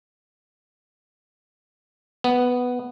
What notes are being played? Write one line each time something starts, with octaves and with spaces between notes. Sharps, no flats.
B3